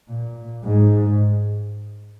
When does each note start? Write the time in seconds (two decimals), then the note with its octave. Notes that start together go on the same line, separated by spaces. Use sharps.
0.08 A#2
0.64 G#2